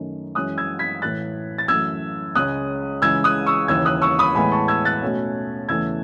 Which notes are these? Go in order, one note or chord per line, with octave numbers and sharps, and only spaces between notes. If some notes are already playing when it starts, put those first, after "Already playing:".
Already playing: F#2 D#3 A3 C#4
F#2 E3 G#3 C#4 D#6 F#6
E6 G#6
G#6 B6
A2 E3 A3 F#6 A6
A6
F#2 E3 A3 E6 G#6
C#2 C#3 G#3 C#4 D#6 F#6
C#2 C#3 E3 G#3 E6 G#6
D#6 F#6
C#6 E6
D#2 C#3 E3 E6 G#6
D#6 F#6
C#6 E6
B5 D#6
A2 E3 G#3 B3 G#5 B5
A5 C#6
E6 G#6
F#6 A6
B2 A3 C#4
E2 C#3 E3 A3 C#4 E6 G#6